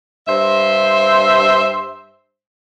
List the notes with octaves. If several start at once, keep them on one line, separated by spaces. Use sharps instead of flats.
G2 C5 E5